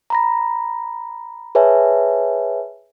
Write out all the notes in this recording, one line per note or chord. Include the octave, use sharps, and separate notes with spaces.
A#5 B5 A#6
G#4 B4 C#5 E5 G#5 A5